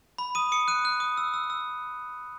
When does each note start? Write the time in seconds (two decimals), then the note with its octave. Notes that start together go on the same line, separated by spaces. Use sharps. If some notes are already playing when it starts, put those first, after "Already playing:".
0.18 B5
0.35 D#6 D#7
0.52 D#6 C#7
0.68 F#6 D#7
0.85 F#6
1.00 D#6
1.17 E6
1.34 E6
1.50 E6